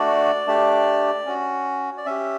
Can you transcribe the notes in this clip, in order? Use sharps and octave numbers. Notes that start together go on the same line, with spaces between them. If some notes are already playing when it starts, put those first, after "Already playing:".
Already playing: A3 D4 F#4 D5
A3 D4 G4
C#4 F#4
D5
C#4 G4 E5